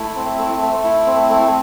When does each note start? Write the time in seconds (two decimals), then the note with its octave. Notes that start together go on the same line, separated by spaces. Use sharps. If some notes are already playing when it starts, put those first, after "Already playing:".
Already playing: A3 E4
0.16 C4
0.38 A3
0.61 A3
0.84 E4
1.07 C4
1.29 A3